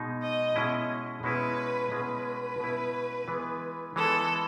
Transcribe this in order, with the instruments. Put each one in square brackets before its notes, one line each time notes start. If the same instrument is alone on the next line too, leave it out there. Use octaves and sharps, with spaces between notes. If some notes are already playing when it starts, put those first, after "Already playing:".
Already playing: [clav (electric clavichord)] B2 G#3 D#4
[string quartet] D#5
[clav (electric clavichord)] B2 G#3 C#4 E4
[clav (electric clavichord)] B2 G#3 C#4 E4 [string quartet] B4
[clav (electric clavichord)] B2 G#3 C#4 E4 [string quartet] B4
[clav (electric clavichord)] B2 G#3 C#4 E4
E3 G#3 B3
[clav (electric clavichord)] E3 G#3 B3 [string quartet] A4